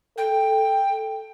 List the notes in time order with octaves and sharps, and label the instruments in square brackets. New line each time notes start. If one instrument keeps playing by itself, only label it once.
[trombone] A4 [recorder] G5